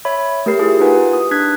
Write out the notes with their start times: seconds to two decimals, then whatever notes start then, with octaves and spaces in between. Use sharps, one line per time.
0.05 C#5 E5 B5
0.46 A3 G4 A#4 C7
0.59 E4 F4 G4 G#4 A#4
0.80 D#4 F4 B4 F#5 G#5
1.13 D#6
1.31 D4 F#6 G#6 B6